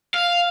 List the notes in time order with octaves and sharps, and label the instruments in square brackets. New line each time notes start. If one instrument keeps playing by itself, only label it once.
[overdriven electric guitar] F5